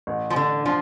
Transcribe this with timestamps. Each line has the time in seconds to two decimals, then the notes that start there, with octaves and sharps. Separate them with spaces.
0.07 A1
0.30 F3
0.36 D3 D4
0.66 F3 D4